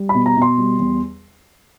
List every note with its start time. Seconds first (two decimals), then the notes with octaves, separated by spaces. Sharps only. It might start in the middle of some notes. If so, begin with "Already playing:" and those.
Already playing: G3
0.09 B5
0.14 B2
0.26 A#5
0.37 B2 C6
0.58 G3
0.80 E2